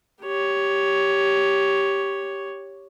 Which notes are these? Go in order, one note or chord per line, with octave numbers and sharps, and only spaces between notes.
G4 C#5